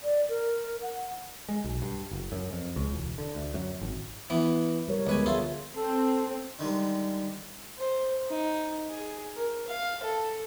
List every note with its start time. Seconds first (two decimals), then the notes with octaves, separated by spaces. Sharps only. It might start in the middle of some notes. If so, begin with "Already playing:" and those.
0.03 D5
0.29 A#4
0.82 F#5
1.49 G#3
1.64 B1
1.82 G2
2.11 F#1
2.32 F#2
2.52 F2
2.76 C#2
2.92 E1
3.18 D3
3.35 D2
3.54 F#2
3.81 G#1
4.30 E3 B3
4.88 G3 A#4 C#5
5.07 C#2 D3 G3 B3 B4 G#5
5.26 F4 G#4 A4 C#5 E5
5.75 C4 A4
6.59 D3 D#3 G3 G#3
7.79 C5
8.30 D#4
8.90 G#4
9.36 A#4
9.68 F5
10.03 A4